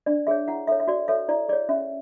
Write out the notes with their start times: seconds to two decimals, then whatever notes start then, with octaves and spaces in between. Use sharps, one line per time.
0.06 D4 D5
0.27 G#4 C#5 E5
0.48 E4 F#5
0.67 A4 C#5 E5
0.80 E5
0.88 F#4 D5
1.08 A4 C#5 E5
1.29 E4 D5
1.49 G#4 C#5 D5
1.69 C#4 E5